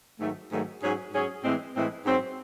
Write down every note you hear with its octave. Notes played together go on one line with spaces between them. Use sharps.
G#2 D#3 F#3 A3
G#2 D#3 F#3 A3
G#2 F#3 C#4 G#4
G#2 F#3 C#4 G#4
A2 E3 G#3 C4
A2 E3 G#3 C4
G#2 F#3 C4